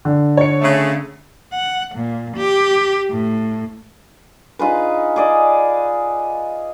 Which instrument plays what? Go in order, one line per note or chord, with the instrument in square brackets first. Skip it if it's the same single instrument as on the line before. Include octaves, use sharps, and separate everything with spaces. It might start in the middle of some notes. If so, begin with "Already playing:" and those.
[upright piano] D3
[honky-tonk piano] C#5 C#7
[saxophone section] C#3 A3
[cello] F#5
A#2
G4
A2
[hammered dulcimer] D#4 F4 G#4 B4
G#4 D5 D#5